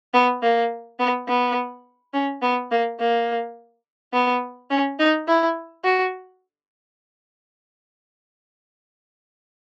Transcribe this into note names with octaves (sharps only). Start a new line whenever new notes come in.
B3
A#3
B3
B3
C#4
B3
A#3
A#3
B3
C#4
D#4
E4
F#4